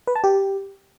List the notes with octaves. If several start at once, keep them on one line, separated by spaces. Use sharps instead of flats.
B4
A5
G4